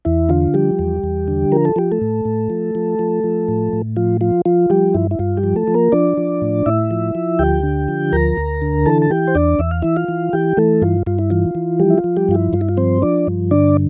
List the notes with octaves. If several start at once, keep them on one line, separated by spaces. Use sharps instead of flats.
E2 E4
D3 F4
F3 G3 G4
E2
E2
D3
F3 A#4
A4
F3 G4
A3 A4
A2
A2
F3
F3
F3
F3
A2
A2
F3 F4
F3 F4
F3 F4
F3 G3 G4
G2 E4
E4
G2 F4
G3 G4
F3
A3 A4
F3
A#3 A#4
F3 D4 D5
F3
A2
A2 E4 E5
F3
F3
D2 G4 G5
D3
F3
D2 A#4 A#5
D2
D3
E3 A4 A5
A5
E3 G4 G5
C5
E2 D4 D5
E2 E5
F5
E3 E4 E5
F4 F5
E3
E3 G4 G5
E3 A3 A4
G2 F4
G2 F4
E4
E3 F4
E3
F3 G3 G4
E4
F4
F3
G3 G4
G2 F4
E4
G2 F4
E4
F4
F3 C4 C5
F3 D4 D5
G2
D3 D4 D5